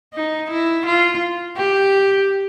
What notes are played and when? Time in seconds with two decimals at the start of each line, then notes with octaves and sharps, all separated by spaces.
0.14 D#4
0.50 E4
0.86 F4
1.57 G4